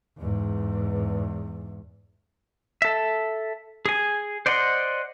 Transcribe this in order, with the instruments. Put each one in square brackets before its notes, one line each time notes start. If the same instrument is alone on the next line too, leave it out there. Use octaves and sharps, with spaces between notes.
[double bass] E2 G#2
[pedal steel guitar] A4 E5
G#4 G#5
C5 D5 D#5 F#5 C6